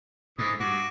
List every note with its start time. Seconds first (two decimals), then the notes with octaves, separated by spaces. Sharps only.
0.39 G#2 D3 E3 D#6
0.60 G2 F#4 D6